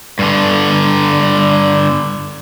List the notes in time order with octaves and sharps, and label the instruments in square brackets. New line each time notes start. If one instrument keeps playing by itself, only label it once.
[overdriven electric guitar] G2 D3